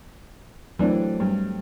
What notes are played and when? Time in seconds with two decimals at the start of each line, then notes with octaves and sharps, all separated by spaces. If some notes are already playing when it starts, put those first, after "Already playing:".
0.79 E3 F#3 A3 C4 D4
1.20 G2